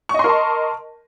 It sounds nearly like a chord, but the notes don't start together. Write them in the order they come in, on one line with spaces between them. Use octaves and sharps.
C#6 D#5 C6 A#4 A5